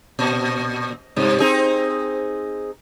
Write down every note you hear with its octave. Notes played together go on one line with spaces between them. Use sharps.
A#2
G2 C3
C4 D#4 G#4